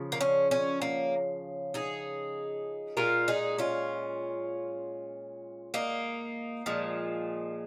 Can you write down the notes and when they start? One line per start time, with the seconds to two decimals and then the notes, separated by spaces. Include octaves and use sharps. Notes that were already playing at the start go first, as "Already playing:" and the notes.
Already playing: C#3 F3
0.12 A#3
0.21 C#4
0.51 C#4
0.82 A#3
1.74 D#4 G#4
2.97 A#2 G#3 F4 A#4
3.28 D#4 G#4
3.58 C#4 F4
5.74 A#3 D#4
6.66 A#2 F3 G#3